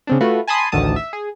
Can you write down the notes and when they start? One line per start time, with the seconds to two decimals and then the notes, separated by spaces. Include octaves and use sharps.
0.07 C#3 C4 D4
0.21 A3 F4 F#4 B4
0.47 G#5 A5 B5 C6 D#6
0.72 A1 D2 D3 D#3 A5 D#6
0.96 E5
1.13 G#4